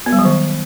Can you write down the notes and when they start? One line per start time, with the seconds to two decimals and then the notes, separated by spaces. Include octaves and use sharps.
0.06 B3
0.12 G3
0.19 F#3
0.25 D#3